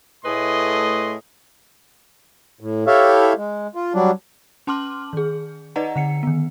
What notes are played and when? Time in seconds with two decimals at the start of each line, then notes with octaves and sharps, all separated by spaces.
0.25 A2 A3 G#4 B4 D#5 C6
2.61 A2
2.87 E4 G4 A4 C#5 E5 F5
3.37 G#3
3.75 F4
3.94 F#3 G3 D4
4.67 C#4 A5 C6 D6 F6 F#7
5.13 D#3 G#4
5.76 D#4 B4 D5 D#5 F#5 A#5
5.96 D3 F#5 C#7
6.23 D#3 B3